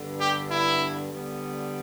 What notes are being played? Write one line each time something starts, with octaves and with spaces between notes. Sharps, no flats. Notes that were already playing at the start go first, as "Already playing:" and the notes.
Already playing: G2 D3 B3
G4
E4
D3 G3 B3